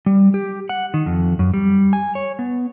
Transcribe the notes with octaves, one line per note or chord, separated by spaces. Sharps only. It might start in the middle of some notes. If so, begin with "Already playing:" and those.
G3
G4
F#5
D#3
F2
F#2
G3
G#5
C#5
B3